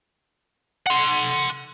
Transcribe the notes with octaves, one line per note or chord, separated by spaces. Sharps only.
F#5 C6